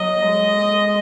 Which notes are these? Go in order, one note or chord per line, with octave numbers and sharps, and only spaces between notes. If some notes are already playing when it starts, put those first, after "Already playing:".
Already playing: F#3 D#5
G#3